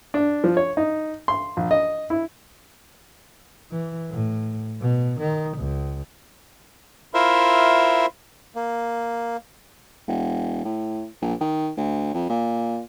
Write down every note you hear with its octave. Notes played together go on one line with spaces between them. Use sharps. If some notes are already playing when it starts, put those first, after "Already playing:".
D4
F3
C#5
D#4
C6
A#1
D#5
E4
E3
A2
B2
D#3
C#2
E4 F4 A#4 C5 E5
A#3
E1
A2
A#1
D#3
D2
F2
A#2